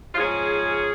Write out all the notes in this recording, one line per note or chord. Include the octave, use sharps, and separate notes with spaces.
F4
G#2 F3 C#4 G#4